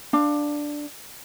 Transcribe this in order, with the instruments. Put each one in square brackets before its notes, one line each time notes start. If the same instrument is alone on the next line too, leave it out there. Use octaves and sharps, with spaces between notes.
[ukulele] D4 F5